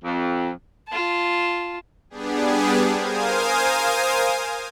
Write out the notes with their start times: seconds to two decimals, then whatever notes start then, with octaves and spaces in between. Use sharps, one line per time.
0.04 F2
0.88 F4 A5
2.10 G3 B3 D4 G4 G#4
2.93 A#4 C5 F5 G#5 D#6